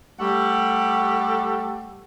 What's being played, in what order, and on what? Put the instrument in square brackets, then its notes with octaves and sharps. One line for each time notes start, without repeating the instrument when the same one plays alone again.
[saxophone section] G3 A3 G4 A4 F#5